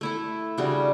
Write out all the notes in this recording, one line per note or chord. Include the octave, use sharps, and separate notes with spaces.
A3 E4 A4
C#3 G3 D4 F#4